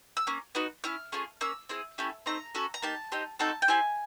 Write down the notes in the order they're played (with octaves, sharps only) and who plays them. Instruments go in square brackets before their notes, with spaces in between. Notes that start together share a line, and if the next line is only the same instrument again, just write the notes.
[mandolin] E6
A#3 C#4
B3 D#4 F#4
C#4 E4 F6
A3 C#4 F4 G#4
A#3 C#4 E6
C4 E4 G#4
A3 C#4 E4 G4
A3 C4 D#4 A#5
C#4 F#4 A4
A#5
A#3 D#4 G4 A5
C4 D#4 G4
C4 D#4 F#4 A4 A5
G5
C4 E4 G4 G#5